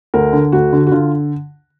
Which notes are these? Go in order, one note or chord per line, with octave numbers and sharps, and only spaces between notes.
D2 A#4
D3
D2 F#4
D3
F#4
D3 F4